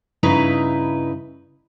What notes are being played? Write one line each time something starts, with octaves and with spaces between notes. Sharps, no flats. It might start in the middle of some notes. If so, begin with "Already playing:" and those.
G2 C#3 D#4 E4 B4 A#5